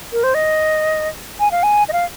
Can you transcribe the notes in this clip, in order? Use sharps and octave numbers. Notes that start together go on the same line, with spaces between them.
A#4
C5
D#5
G#5
F5
G#5
D#5
F5